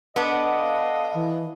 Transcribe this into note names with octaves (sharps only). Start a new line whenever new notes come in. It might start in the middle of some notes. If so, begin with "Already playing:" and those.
B3 D4 A4 D#5
F5
E3